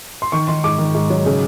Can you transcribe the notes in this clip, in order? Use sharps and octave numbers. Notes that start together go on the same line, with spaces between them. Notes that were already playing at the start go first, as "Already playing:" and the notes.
C6
D#3 C#6
D#3 C6
G#2 D6
D#3
G#2
F#3
C#3